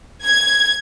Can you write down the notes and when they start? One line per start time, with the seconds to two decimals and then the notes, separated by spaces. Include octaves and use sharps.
0.24 G#6